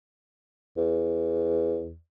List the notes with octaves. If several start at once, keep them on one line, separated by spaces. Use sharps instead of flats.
E2